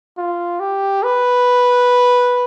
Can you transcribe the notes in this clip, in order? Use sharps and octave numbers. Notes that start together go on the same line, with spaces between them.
F4
G4
B4